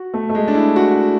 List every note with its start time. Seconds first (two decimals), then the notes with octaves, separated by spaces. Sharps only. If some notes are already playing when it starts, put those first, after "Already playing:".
Already playing: F#4
0.14 A3
0.29 A3
0.35 G#3
0.48 D4
0.55 E4
0.76 F#4